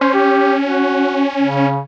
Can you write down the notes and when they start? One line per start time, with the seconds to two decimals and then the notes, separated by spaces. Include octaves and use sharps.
0.01 C#4 C5
0.14 G4
0.66 F#4
1.42 C#3